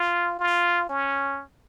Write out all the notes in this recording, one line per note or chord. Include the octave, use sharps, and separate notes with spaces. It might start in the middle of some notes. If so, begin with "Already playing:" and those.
Already playing: F4
F4
C#4